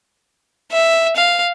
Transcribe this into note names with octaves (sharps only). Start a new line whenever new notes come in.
E5
F5